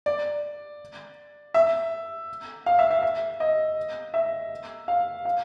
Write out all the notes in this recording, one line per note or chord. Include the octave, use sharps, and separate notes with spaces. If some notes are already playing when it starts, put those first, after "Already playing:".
D5
E5
F5
E5
E5
E5
D#5
E5
F5
F5